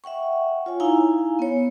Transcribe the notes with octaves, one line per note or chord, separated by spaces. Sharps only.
E5 F#5 G5 C#6
F4 C#5 G#5
D#4 E4 F5 G#5 A#5
B3 C#5